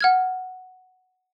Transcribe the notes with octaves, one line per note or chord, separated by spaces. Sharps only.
F#5 F6 G#6